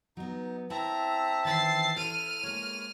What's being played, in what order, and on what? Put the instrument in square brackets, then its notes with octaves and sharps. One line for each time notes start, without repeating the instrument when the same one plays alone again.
[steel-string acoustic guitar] F#3 B3 [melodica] D#4
[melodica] C4 E5 A5 [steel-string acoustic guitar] E4 [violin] A#5
[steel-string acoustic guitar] D#3 E3 [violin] A6 C7
[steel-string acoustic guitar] E4 A4 [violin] F6 D#7
[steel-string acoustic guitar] G#3 A#3 [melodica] C#5